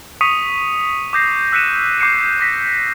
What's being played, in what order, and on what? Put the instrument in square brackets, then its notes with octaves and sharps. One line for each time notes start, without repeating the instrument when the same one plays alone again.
[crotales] C#6 D#6 B6 C#7 D#7 F7
D6 D#6 G6 A#6 C7
E6 F#6 B6 C#7 D#7 E7
D6 G6 C7 C#7 E7
D6 A#6 B6